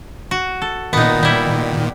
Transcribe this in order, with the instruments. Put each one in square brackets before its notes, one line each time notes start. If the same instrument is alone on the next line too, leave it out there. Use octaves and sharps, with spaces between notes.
[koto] F#4
A4
[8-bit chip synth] A#2 D#3 [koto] B3 D#4
[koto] G3 E4